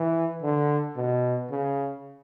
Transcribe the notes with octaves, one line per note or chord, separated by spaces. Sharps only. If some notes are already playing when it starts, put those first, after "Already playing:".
Already playing: E3
D3
B2
C#3